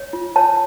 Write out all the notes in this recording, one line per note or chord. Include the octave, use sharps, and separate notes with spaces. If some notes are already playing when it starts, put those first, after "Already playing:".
Already playing: C#5
F4
C#5 A5